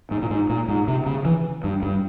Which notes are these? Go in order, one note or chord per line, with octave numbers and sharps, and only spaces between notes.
G#2
A#2
G#2
A#2
G#2
C3
C#3
E3
G2
G2